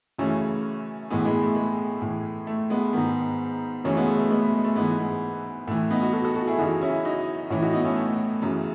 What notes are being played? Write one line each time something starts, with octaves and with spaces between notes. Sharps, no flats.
F#2 C#3 E3 A3 C#4
A2 E3 G#3 B3
G#3 B3
A3
G#3
A2 E3
A3
G#3 B3
G#2 D#3 G#3 B3
F#2 C#3 E3 A3 C#4
G#3 B3
A3
A3
G#3 B3
A3
G#3
A3
G#2 E3 G#3 B3
G#3 B3
A2 E3 A3
B3 D#4
D#4 F#4
F#4 A4
F#4 A4
F#4 A4
E4 G#4
F#2 C#3 E3 D#4 F#4
C#4 E4
D#4 F#4
A2 E3 C#4 E4
D#4 F#4
B3 D#4
A3 C#4
A3
F#2 C#3 E3